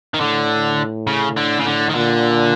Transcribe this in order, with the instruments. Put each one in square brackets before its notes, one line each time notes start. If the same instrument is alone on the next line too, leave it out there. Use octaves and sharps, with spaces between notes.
[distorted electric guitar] D#3
[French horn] A2 [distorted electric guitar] D3
[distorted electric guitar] C#3
D3
C#3
D3
D#3
[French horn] A#2 [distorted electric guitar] D3